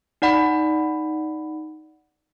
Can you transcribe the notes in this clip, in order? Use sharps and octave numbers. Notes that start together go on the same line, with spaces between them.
D#4 D5 F#5 B5